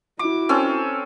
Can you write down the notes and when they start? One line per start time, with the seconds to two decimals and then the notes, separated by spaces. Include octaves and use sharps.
0.19 E4 F#4 D6
0.49 C4 C#4 A4